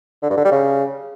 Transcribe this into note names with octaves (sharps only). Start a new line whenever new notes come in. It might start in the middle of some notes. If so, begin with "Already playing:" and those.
D3
G2
D3
G3
C#3